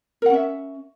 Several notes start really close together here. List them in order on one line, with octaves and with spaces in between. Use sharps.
A#4 F#5 C#4 E5